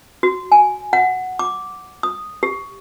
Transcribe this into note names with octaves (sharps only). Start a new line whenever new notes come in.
F#4
G#5
F#5
D6
D#6
G4